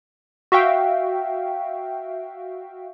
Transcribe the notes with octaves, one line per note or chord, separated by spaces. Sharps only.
F#4 E5 F5 G5